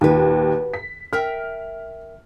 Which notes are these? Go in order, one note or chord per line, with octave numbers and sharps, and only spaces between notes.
D#2 A#2 D#3 F#4 B4
B6
A#4 E5 G5 F6